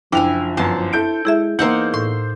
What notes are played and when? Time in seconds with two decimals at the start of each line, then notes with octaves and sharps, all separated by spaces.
0.12 F#1 F3 D4 E4 G5 G#5 F7
0.57 G1 F#2 C5 A5
0.93 E4 A4 G6 D7
1.25 G#3 E4 G#4 E5
1.59 E2 A#3 D#4 C5 F#5 E6 G6
1.94 A2 C6